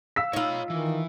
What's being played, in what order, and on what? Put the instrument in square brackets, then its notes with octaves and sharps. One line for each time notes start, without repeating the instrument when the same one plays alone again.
[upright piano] F5 E6 B6
[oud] D#4 F4 [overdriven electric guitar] C#5 B5
[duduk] D#3 [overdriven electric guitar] E3